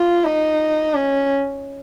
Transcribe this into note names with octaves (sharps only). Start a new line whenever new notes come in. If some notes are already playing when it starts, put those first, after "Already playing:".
Already playing: F4
D#4
C#4